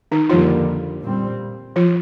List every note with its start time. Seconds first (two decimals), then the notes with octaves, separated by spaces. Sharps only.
0.12 D#3 D#4
0.30 F2 D3 F3 G3 A#3 F4
1.03 A#2 G3 C4
1.76 F3 F4